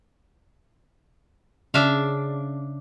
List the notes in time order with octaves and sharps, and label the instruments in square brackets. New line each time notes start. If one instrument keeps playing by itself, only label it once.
[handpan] C#3 [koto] D4 E5 F5